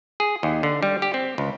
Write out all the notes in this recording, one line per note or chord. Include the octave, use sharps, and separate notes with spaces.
G#4
D#2
D3
G3
G4
C4
C#2